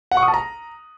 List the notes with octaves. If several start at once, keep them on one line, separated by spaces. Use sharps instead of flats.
F#5
C#6
D#6
A5
A#5